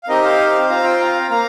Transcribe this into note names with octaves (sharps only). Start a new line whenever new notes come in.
F5
C4 D#4 G4 A#4 D#5
C5 F5
C4 F4 F5 A#5
G5 C6
F5 A#5
A#3 F5 A#5